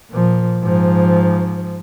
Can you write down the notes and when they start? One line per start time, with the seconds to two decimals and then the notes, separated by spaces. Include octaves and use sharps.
0.11 A#2 F3
0.63 G#2 F3